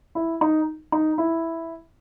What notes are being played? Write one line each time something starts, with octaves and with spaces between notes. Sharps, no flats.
E4
D#4
D#4
E4